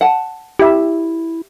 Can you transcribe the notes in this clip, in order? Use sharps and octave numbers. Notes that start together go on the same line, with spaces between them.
F#5 A5
E4 G4 E5